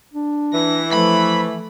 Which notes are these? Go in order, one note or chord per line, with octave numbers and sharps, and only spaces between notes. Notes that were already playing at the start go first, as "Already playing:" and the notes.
D4
E3 A#6
F3 A3 B5